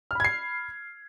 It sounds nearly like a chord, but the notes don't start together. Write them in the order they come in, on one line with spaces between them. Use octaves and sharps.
F6 B5 G#6 C7